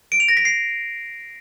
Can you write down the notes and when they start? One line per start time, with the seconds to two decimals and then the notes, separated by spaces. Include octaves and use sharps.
0.12 D7
0.20 F7
0.29 A#6
0.37 B6
0.45 C7